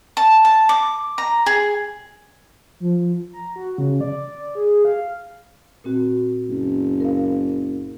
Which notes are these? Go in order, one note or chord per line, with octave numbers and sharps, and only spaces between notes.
A5
A5
D6
A#5
G#4
F3
A#5
F#4
C#3
D5
G#4
F5
A#2 C4 F#4
F#1
A#4 F5